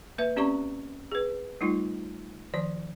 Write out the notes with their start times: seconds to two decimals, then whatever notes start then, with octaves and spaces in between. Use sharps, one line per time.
0.18 A#3 B4 E5
0.36 C4 C#4 G4 D5 A#5 C#6
1.12 G#4 B4
1.61 G3 A3 D#4 F4
2.54 D#3 F3 D5